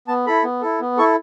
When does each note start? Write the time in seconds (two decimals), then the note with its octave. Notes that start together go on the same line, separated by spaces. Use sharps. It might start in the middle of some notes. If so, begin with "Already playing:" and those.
0.08 B3 A5
0.27 E4 A4 B5
0.44 B3
0.62 E4 A4
0.81 B3
0.97 E4 A4 C#6